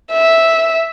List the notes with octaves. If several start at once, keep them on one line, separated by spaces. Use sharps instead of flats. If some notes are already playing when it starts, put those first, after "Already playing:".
E5